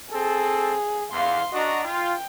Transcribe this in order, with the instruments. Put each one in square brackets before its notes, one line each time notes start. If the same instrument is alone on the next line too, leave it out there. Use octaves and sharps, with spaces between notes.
[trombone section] C4 A4 [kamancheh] G#4
[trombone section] E2 [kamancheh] F5 C6
[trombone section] D4 F#4 [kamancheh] D#5 A#5
[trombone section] F4 [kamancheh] G5